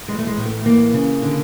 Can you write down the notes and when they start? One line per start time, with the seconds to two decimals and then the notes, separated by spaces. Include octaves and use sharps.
0.08 E3 G#3
0.19 A3
0.27 G#3
0.37 A2
0.46 A3
0.65 E3 A#3
0.94 C#3
1.22 D3